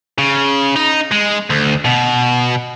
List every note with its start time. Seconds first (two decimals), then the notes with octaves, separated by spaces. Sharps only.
0.19 C#3
0.76 D#4
1.12 G#3
1.50 D2
1.85 B2